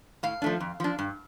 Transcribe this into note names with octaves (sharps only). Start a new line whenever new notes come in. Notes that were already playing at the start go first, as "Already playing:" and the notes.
A2 F5
F3 A3 D4
F2
F3 D4
G2